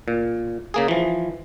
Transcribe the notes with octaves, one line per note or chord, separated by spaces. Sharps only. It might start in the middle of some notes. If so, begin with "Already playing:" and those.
A#2
C#3 A#3 G#4
E3 F3